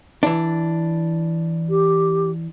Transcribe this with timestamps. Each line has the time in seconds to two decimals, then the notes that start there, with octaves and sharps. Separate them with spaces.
0.23 E3 D4
1.70 G4